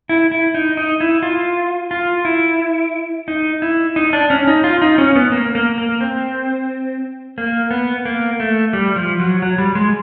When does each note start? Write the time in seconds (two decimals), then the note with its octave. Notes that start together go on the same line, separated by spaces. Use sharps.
0.09 E4
0.32 E4
0.55 D#4
0.77 D#4
1.01 E4
1.23 F4
1.91 F4
2.25 E4
3.28 D#4
3.62 E4
3.96 D#4
4.13 D4
4.30 C#4
4.47 D#4
4.64 F4
4.82 D#4
4.98 C#4
5.16 B3
5.32 A#3
5.55 A#3
5.78 A#3
6.01 C4
7.38 A#3
7.71 B3
8.05 A#3
8.40 A3
8.73 G3
8.96 F3
9.20 F#3
9.42 F#3
9.58 G3
9.75 G#3